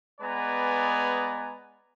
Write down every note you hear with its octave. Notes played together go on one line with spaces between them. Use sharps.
G#3 B3 B4 D5 G#5 A#5